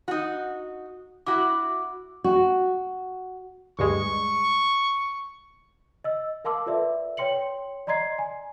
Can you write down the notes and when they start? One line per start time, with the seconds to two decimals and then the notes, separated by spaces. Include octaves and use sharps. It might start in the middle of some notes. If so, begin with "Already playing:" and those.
0.08 D#4 F#4
1.27 E4 F#4 D6
2.24 F#4
3.79 D2 G2 G#3 C#6
6.04 D#5 E6
6.45 A#4 F5 A5 C6 D6 E6
6.66 F4 A4 B4 D5 E5
7.17 C#5 G5 C6 C#7 F#7
7.87 D5 D#5 A#5 C6 G#6 C7
8.19 G#5